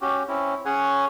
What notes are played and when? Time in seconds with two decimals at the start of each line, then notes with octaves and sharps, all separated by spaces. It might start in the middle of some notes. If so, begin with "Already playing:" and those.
0.01 C#4 F#4 G4
0.28 C4 C#4 E4
0.65 C#4 G#4 C#5 F#5 G#5